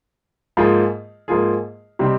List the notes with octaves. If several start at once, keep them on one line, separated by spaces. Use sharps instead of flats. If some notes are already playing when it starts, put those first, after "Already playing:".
G#2 F3 A#3 F4 G#4
G#2 F3 A#3 F4 G#4
C3 G3 C4 D#4